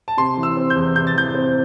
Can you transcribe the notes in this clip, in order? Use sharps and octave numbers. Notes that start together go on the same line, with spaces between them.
A5
C3 C6
E3
E6
C4
G6
E2
C3 G6
A6
E3 G6
C4